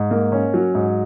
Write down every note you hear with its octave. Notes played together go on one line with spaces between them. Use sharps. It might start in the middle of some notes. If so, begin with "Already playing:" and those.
Already playing: G#2
A#3
C#4
F#3
G#2